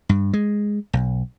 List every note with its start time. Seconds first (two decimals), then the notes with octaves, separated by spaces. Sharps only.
0.09 G2
0.33 G#3
0.93 B1